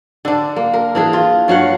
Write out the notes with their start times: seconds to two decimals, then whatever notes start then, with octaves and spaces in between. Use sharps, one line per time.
0.25 D3 D4
0.56 A#3
0.74 A#4
0.95 E3 D4 G#4
1.13 F4
1.48 G2 F#3 F5 F#5